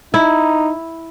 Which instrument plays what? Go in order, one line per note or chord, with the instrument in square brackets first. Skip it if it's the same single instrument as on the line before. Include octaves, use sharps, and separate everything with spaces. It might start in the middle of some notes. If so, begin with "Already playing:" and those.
[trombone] D#4 [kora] E4